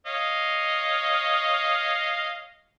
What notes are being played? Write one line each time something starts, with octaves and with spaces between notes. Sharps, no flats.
C#5 D#5 F5